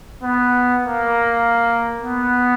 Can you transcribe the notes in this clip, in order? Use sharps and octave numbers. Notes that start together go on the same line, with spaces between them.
B3
A#3
B3